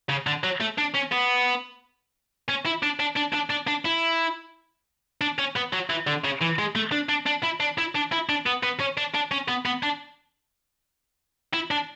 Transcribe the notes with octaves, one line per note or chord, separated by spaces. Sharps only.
C#3
D3
F#3
A3
D4
C#4
B3
C#4
E4
D4
D4
D4
D4
D4
D4
E4
D4
C#4
B3
F#3
E3
D3
C#3
E3
G#3
A3
D4
D4
D4
E4
D4
E4
D4
E4
D4
B3
B3
C#4
D4
D4
C#4
B3
B3
D4
E4
D4